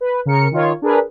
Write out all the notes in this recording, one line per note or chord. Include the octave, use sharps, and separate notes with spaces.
B4
C#3 A#4 C#7
D#3 F4 C#5
D4 G#4 A#4 B4